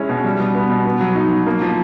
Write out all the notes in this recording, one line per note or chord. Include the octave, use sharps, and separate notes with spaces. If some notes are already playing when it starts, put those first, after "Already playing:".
Already playing: G#3 C#4 E4
B2
G3
B2
B3
B2
B3
F#3
D#4
F#3
A#3
F3